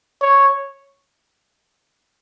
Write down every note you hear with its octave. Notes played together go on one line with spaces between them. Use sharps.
C#5